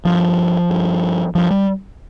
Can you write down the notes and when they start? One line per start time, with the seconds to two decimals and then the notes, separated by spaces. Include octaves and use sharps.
0.05 G2 F3
0.70 G2
1.35 G2 F3
1.51 G3